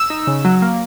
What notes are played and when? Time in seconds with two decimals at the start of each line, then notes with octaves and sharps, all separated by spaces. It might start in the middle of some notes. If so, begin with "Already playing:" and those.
Already playing: E6
0.10 D#4
0.27 C#3
0.45 F#3
0.62 A#3